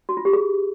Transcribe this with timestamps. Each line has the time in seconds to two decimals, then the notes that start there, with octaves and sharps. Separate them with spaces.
0.09 F#4
0.17 F4
0.25 G4
0.33 G#4